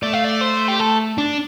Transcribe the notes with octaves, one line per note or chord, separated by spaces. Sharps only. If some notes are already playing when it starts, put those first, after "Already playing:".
A3 D5
F5
D5
C5
G4
A4
D4